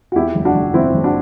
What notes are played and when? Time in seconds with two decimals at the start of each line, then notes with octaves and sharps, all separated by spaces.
0.12 F#4
0.15 E2 E4 G4
0.35 F#1
0.45 D4 F#4
0.55 F#1
0.74 F#1 C4 E4
0.94 F#1
1.04 D4 F#4